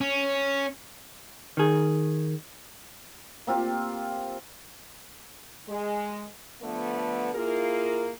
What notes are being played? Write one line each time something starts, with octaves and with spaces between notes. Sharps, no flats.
C#4
D#3 G#4
A#3 C4 F4 G4
G#3
D3 F3 A3 B3
A#3 E4 F4 G#4 A#4